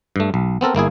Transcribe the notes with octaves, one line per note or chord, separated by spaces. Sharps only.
G2 A3
B1
B3 C4 A4 A#4
G1 A#3 E4 G#4